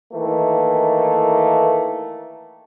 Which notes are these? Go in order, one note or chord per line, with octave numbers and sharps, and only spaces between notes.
D#3 E3 A3 A#3